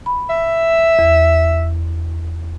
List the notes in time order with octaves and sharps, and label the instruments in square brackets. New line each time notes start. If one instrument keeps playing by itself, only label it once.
[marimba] B5
[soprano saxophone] E5
[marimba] E2